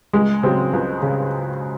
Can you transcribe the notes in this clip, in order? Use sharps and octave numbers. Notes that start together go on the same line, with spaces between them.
C#2 G#3
C#3 F#3 C4
C#2
C#3